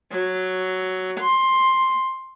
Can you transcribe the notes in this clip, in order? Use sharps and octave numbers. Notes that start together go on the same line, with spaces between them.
F#3
C6